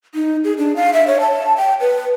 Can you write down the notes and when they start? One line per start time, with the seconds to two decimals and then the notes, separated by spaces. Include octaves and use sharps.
0.15 D#4
0.44 G#4
0.58 D4
0.76 F5
0.93 E5
1.07 C#5
1.20 A5
1.57 G5
1.80 B4